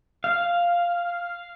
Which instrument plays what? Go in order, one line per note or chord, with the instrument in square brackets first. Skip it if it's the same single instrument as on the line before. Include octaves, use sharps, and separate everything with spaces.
[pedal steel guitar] F5